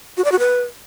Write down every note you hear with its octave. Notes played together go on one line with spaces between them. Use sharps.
F#4
D5
F#4
B4